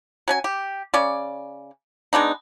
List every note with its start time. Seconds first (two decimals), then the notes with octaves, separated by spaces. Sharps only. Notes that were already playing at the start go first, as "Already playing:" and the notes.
0.28 F#3 C#4 G#5
0.44 G4
0.94 C#3 C#4 D5
2.13 G#3 B3 D4 D#4